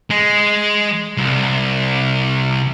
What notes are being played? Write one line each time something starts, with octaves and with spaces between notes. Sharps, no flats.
G#3
C2